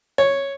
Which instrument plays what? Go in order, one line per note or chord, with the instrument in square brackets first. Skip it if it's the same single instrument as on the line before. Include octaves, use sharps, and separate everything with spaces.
[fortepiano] C#5